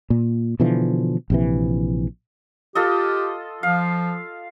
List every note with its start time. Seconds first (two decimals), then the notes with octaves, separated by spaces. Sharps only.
0.10 A#2
0.60 B2 D3 E3 F3
1.30 A#1 C3 E3
2.75 F4 G4 A4 D#5
3.63 F3 F5